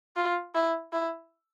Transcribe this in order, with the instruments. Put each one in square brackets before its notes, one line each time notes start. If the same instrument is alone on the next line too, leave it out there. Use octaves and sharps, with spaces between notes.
[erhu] F4
E4
E4